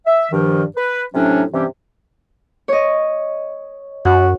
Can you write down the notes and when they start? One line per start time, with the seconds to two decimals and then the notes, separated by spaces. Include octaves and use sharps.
0.07 E5
0.32 G2 D#3 F3
0.77 B4
1.14 A2 C3 F#3 C#4 D4
1.53 G2 C3 E3 C4 C#4 G4
2.68 C#5 D#5
4.05 F#2 F#4